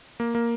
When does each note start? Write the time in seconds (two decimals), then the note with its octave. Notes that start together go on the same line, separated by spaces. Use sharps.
0.20 A#3
0.35 A#3